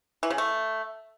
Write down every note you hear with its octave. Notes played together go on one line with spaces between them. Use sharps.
E3
C#3
A3